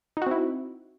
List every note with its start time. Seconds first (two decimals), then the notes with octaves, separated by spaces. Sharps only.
0.17 D#4
0.22 F#4
0.27 C4
0.31 E4